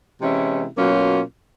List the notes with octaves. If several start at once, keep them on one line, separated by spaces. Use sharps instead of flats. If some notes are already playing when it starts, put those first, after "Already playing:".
C3 E3 G#3 C#4 E4
B2 F#3 A#3 C#4 F4